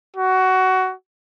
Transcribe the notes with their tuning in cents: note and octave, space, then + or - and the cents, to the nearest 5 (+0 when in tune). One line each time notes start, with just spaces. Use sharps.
F#4 +15